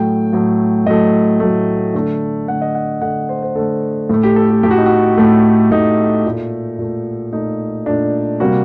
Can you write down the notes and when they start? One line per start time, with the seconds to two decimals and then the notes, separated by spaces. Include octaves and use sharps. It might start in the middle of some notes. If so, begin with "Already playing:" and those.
Already playing: A2 F#3 A3 G5
0.33 A2 F#3 A3
0.86 A2 F#3 A3 D#5
1.40 A2 F#3 A3
1.94 D3 A3
2.48 D3 A3 F#5
2.62 D#5
2.75 F#5
3.01 D3 A3 F#5
3.29 C5
3.43 C5
3.55 D3 A3 A4
4.09 A2 A3
4.23 G4
4.36 A4
4.50 G4
4.63 A2 A3 G4
4.71 F#4
4.78 D#4
4.86 F#4
5.18 A2 A3
5.71 A2 A3 D#4
6.25 A#2 A3
6.79 A#2 A3
7.32 A#2 A3 D#4
7.86 A#2 A3 D4
8.40 C3 G3 A#3 F#4